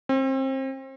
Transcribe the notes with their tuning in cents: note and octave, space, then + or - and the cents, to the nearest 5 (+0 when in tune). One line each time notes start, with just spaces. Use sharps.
C4 +30